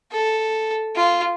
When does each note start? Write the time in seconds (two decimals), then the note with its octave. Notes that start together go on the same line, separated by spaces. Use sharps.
0.12 A4
0.96 F4